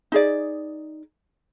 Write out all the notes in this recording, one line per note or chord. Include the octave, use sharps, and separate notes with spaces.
D#4 G#4 D5